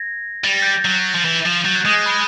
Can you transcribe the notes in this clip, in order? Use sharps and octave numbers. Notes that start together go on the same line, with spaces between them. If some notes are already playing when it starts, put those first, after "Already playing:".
Already playing: G#6 A#6
G3 A6
A#6
G6 A6
F#3
F3
E3
F3
F#3 G6 A6
F#6 G#6
G#3 D#6
B5